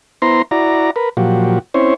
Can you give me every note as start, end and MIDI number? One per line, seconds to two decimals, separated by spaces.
0.22 0.42 59
0.22 0.42 64
0.22 0.42 72
0.22 0.42 82
0.22 0.42 84
0.51 0.91 64
0.51 0.91 66
0.51 0.91 74
0.51 0.91 82
0.96 1.09 70
0.96 1.09 71
1.17 1.59 46
1.17 1.59 53
1.17 1.59 54
1.17 1.59 66
1.17 1.59 67
1.74 1.94 60
1.74 1.94 61
1.74 1.94 64
1.74 1.94 72
1.74 1.94 73